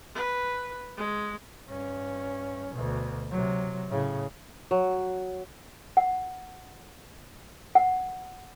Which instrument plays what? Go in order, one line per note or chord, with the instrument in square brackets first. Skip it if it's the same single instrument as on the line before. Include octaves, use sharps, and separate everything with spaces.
[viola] B4
G#3
[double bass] G2 C#4
D2 B2
C3 F#3
A2 C#3
[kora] F#3
[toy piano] F#5
F#5